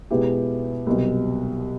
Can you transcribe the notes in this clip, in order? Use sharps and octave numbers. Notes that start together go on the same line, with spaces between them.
B2 G#3 B3 E4 G4
C2 B2 F#3